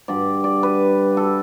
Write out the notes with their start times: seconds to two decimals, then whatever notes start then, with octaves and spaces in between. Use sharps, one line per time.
0.08 G2 D3 G3 D5
0.44 D5
0.63 B4
1.17 A4